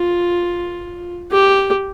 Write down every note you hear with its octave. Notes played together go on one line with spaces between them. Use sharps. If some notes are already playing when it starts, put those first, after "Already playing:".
Already playing: F4
G4